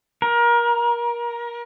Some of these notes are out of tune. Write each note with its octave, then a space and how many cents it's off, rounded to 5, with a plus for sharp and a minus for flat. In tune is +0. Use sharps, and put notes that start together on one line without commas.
A#4 +25